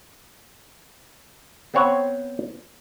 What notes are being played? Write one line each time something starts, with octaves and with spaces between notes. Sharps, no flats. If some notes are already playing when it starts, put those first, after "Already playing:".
B3 C4 C5 C#5 F#5